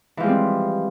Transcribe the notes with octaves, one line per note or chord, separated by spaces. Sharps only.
E3 F3 G3 G#3 C4